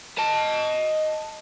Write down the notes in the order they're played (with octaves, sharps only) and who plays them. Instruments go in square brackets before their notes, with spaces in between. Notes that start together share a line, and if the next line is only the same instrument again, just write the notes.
[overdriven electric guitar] D#5 A5